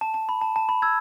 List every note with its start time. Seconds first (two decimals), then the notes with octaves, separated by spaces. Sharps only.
0.01 A5
0.14 A5
0.29 B5
0.41 A5
0.56 A5
0.69 B5
0.82 E6 G#6